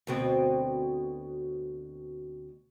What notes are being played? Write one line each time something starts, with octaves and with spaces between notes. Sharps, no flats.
D2 B2 C4